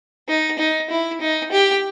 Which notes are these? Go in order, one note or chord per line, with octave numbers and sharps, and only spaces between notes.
D#4
D#4
E4
D#4
G4